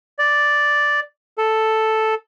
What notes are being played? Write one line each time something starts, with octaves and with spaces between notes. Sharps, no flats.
D5
A4